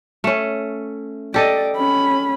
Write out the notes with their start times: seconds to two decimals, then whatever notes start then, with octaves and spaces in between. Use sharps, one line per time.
0.24 A3 C#4
1.34 G4 A4 D5 D#5
1.76 C#4 B5